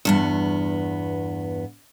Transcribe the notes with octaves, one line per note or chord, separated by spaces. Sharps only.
E2 G2 B3